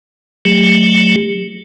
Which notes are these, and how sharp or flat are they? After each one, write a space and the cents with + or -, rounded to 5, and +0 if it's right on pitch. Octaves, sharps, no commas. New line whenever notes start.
F#3 +0 A3 +0 G4 +35